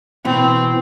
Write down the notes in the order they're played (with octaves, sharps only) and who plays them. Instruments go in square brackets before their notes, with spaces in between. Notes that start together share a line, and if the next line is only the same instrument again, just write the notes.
[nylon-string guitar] B2 E3 [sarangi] C4